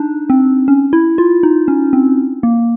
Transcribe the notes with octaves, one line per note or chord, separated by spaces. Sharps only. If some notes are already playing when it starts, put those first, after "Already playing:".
Already playing: D4 D#4
C4
C#4
E4
F4
D#4
C#4
C4
A#3